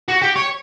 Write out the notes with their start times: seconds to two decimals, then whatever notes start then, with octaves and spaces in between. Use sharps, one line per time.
0.08 F#4
0.22 G4
0.36 C#5